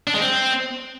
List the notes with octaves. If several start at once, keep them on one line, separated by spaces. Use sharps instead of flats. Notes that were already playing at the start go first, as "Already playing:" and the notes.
D4
G#3
C4